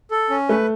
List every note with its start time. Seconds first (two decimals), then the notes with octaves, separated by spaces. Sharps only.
0.11 A4
0.30 C#4
0.49 A3 B4